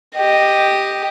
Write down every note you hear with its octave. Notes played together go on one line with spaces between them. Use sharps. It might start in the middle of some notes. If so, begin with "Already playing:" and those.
G4 D#5